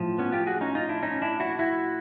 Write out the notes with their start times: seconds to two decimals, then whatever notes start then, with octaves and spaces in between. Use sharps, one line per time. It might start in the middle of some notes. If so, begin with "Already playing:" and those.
Already playing: A2 F3
0.18 B3 C#4
0.32 F4 G4
0.46 F#4 G#4
0.61 C#4 D#4
0.75 D#4 F4
0.89 D4 E4
1.03 C#4 D#4
1.22 D4 E4
1.40 E4 F#4
1.59 E4 F#4